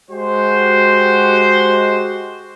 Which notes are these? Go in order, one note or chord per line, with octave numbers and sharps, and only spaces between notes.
G#3 F#4 G4 C5